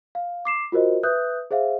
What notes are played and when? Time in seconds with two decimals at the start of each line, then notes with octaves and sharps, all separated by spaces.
0.15 F5
0.45 D6 C7 E7
0.72 F4 F#4 A#4 C5 D#5
1.03 B4 E5 D#6 F#6 G6
1.51 G#4 C5 E5 F5